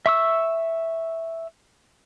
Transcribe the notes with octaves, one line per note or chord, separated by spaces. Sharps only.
E5 C#6 E6